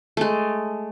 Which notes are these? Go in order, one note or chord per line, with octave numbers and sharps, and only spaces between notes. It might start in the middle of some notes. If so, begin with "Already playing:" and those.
G#3 A3